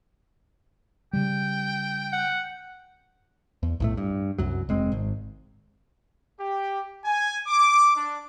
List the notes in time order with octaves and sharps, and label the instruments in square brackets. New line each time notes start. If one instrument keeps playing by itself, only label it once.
[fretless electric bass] C#3 G3 [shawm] G5
[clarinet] F#5
[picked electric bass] E2
B1 A2 A3
G2
C2 F#2 F#3
F1 G#3 C4
G#1
[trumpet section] G4
G#5
D6
D4